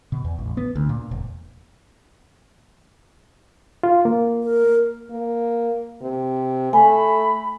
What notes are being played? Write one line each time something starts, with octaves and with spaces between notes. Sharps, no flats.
B2
E2
A1
B3
D2
A#2
E1
F4
A#3
A#4
A#3
C3
A3 G#5 B5